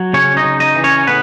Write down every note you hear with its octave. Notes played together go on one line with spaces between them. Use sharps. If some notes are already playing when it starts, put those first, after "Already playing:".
Already playing: F#3
C#3 C#4 C#5
D#4 D#5
C#3
D#4 D#5
E3
C#4 C#5
A2 B3 B4